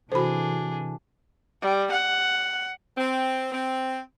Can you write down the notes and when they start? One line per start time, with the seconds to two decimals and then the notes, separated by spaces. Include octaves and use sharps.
0.12 C3 E3 D4 F#4 G#4 A4 C5 B5
1.62 G3
1.91 F#5
2.97 C4
3.52 C4